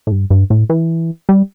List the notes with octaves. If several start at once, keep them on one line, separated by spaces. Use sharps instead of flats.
A2
G2
G2
A2
E3
G3